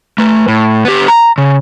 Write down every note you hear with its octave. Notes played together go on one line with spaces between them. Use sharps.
A3 B4
A2
B3 G4
A#5
C#3